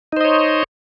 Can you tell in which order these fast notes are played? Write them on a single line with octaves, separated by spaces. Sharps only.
D#4 C5 D#5 C#5